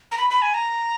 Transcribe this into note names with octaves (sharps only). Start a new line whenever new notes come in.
A#5
B5
B5
G#5
A#5